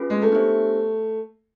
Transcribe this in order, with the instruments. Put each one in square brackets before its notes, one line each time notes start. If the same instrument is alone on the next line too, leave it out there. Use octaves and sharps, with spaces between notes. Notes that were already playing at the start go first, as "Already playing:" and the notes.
Already playing: [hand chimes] C#4 F4 G#4 B4
[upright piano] G#3
A3
[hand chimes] B3 D4 G4 C5 E5